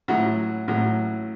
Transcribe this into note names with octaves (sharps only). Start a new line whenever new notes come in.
A1 A2 F#3 F#4
A1 A2 F#3